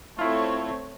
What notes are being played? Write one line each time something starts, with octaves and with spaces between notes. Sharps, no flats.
A3 C4 E4 F4 C#5